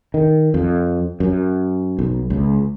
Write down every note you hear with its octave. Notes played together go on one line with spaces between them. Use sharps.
D#3
F2
F#2
B1
C#2